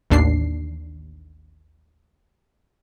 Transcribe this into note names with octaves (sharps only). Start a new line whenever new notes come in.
A1 D#2 D4 C7